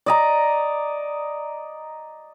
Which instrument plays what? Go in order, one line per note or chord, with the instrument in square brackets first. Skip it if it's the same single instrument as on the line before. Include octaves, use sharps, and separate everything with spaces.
[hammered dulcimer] D5 D#5 A#5